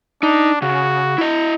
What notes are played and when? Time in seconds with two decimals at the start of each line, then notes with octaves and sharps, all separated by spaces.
0.23 D4 D#4
0.62 C#3 F#4
1.18 E4 D#5